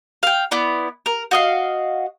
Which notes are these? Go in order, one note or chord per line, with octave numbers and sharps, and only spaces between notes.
F5 G5
B3 E4 D5
A#4
F#4 D#5 F5